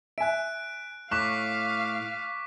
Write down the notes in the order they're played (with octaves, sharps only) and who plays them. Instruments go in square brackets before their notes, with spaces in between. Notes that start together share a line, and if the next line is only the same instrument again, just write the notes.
[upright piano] E5 G#5 [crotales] F#6 D7
[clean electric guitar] A2 [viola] F5 [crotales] C#6 D6 B6 [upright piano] F#6 E7